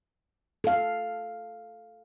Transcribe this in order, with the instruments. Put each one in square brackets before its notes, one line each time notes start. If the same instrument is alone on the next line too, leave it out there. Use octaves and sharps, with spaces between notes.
[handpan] A4 F5